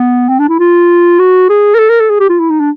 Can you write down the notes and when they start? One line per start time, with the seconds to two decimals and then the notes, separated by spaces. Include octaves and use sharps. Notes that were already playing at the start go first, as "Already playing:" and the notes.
Already playing: B3
0.29 C4
0.39 D4
0.49 E4
0.59 F4
1.19 F#4
1.49 G#4
1.74 A#4
1.79 A4
1.90 A#4
2.00 A4
2.10 G#4
2.20 G4
2.29 F4
2.39 E4
2.50 D#4
2.60 D4